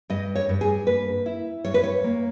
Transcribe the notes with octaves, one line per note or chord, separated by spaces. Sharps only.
G2 D#5
C#5
G2
G#4
A#3 B4
E4
G2 C#5
B4
C#5
A#3